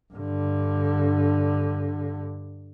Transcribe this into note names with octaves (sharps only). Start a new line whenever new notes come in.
G2 D3